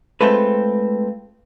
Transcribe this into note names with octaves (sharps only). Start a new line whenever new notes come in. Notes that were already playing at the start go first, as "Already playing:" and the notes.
G#3 A3 C4 F4 A4 B4